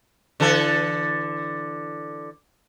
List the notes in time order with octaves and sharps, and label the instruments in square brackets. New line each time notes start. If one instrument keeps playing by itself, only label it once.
[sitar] D3 E3 A4